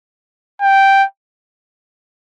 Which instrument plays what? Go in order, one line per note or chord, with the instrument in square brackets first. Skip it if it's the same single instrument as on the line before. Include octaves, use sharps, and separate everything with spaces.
[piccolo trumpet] G5